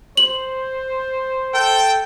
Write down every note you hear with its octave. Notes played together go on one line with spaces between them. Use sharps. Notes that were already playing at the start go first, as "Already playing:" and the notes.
C5 F#7
A4 G5